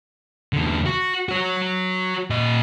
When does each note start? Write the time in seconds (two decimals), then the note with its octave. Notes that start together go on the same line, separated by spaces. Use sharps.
0.53 E2 D3
0.86 F#4
1.29 F#4 C#5
2.30 A#2 D#5